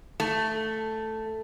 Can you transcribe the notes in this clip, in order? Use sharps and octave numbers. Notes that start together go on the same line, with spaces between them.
A3